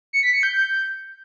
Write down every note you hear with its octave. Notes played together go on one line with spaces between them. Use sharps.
C#7
B6
C#7
G6